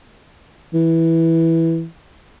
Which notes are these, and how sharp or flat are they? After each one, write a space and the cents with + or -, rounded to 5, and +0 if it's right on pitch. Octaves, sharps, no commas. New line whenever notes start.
E3 -5